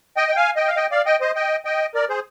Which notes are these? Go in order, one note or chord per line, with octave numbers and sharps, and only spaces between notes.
D#5 G5
G5
F5 G#5
D#5 G5
F5
D#5 G5
D5 F5
D#5 G5
C5 D#5
D#5 G5
D#5 G5
A#4 D5
G#4 C5